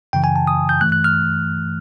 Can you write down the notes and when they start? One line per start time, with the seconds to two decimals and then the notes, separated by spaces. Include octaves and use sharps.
0.13 F#2 C#3 E3 G5
0.24 G#5
0.36 A5
0.47 D#6
0.69 G6
0.81 G2 E3 A3 F#6
0.92 F#6
1.04 F6